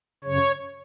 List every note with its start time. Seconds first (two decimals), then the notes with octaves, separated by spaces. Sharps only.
0.24 F#2 C#3 C#5